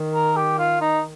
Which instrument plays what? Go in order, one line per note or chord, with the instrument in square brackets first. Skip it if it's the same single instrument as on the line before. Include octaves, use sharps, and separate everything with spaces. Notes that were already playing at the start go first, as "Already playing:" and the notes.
Already playing: [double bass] D#3
[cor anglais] A#4
G4
F4
D#4